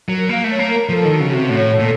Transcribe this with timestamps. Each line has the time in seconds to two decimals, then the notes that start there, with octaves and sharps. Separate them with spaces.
0.09 F#3 A#4
0.29 A#3 F5
0.44 A3 C#5
0.59 A#3
0.69 A#4
0.89 F3 A4
1.05 D#3 F#4
1.20 C#3
1.30 C3 F#4
1.49 A2 C#5
1.70 A4
1.80 A#2